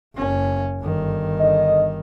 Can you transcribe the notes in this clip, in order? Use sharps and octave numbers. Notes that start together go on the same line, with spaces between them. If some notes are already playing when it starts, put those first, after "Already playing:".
F#1 C#4
G1 D#3
D3 D#5